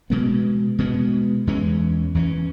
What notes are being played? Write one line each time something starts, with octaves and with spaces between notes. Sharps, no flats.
B2 G#3 B3
B2 G#3 B3
E2 E3 G#3 C#4
E2 E3 G#3 C#4